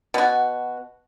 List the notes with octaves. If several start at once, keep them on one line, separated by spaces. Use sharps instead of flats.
B2 F#4